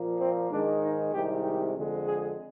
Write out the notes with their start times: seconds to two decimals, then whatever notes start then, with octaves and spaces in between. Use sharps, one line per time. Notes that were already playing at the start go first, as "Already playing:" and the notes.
Already playing: A#2 F3 A#3
0.19 C4
0.50 G#2 D#3 G#3 D4
0.81 D#4
1.12 C2 C3 D#3 G#3 G4
1.43 G4
1.74 F2 D3 G#3
2.05 G#4